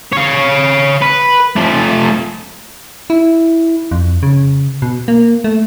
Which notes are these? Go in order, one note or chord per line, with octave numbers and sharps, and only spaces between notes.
C#5 F5
B4
F3 A3
E4
F2
C#3
B2
A#3
A3